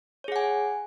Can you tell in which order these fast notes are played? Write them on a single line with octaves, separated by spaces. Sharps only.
C#5 G#4 F#5 G#5